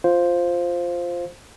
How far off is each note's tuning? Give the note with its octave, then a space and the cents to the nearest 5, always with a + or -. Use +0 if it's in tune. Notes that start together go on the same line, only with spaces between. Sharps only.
F4 +0 C5 +0 F5 +0